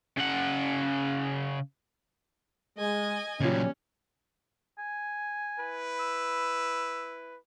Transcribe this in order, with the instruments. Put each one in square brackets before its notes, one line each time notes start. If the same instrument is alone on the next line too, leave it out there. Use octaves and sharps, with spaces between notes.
[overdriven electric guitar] C#3 F#5
[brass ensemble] G#3 [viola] D#5 G#5
[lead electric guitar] A#2 F#3 [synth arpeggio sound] C#3 F4 [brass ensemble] G3 C#4
[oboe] G#5
[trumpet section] E4 B4
[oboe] E6